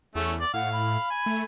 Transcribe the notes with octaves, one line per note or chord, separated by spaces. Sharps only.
E2 A3 C#4
D5
A2 F5 F#5
B5
G#5
A3